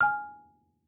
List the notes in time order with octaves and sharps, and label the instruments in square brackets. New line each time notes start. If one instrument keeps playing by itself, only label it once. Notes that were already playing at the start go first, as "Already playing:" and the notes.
[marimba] G#5 F6